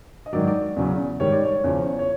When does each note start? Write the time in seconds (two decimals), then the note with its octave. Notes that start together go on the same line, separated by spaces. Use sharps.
0.26 D#5
0.33 G#2 D#3 F#3 D5
0.47 D5
0.76 E2 C#3 F#3
1.20 G#2 D#3 G3 C#5
1.32 D5
1.45 C#5
1.64 E2 C#3 F3
1.99 C#5